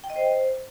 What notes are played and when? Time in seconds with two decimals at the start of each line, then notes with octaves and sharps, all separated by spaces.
0.04 G5
0.10 D#5
0.16 C5